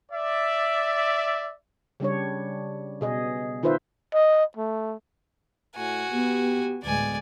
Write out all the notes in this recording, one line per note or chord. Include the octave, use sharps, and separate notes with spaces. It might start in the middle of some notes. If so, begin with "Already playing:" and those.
D5 E5
C#3 G3 D4 C#5
B2 G#4 D#5
D#3 D#4 F4 B4 C5 E5
D#5
A3
A2 F#4 G#5
B3 G4
D2 A2 G#3 B3 D5 G#5